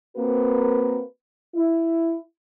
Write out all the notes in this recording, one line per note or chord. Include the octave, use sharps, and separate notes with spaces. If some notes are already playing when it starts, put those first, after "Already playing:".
A#3 C4 F#4 A#4 B4
E4